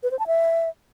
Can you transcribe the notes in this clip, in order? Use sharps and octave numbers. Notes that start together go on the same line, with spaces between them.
B4
C5
A5
E5